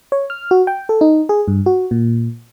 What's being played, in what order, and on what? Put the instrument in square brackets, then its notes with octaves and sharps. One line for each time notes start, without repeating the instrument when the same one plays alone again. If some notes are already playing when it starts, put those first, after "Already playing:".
[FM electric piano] C#5
F6
F#4
G5
A4
D#4
G#4
G2
F#4
A#2